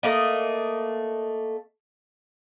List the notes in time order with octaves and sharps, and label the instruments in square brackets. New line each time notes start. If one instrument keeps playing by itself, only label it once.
[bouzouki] A3 A#3 D#5